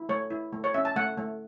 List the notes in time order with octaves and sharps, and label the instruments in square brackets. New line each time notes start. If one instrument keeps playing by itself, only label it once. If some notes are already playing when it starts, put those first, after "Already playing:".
Already playing: [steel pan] E4
A3 C#5
E4
A3
C#5
C#4 E5
A5
A3 F#5
A3